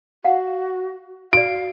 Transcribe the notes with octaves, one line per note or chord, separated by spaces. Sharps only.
F#4 F5 F#5
F#4 D5 F5 D7